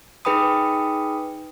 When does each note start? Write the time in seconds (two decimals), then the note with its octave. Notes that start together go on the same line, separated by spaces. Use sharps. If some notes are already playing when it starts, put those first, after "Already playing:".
0.25 D#4 G#4 B4 G5 B5 D#6